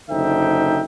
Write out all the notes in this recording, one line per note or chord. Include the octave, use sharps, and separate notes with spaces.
F#1 D3 D#4 C5 E5 G5